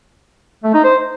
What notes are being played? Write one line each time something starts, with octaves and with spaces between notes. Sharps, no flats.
A3
D#4
C5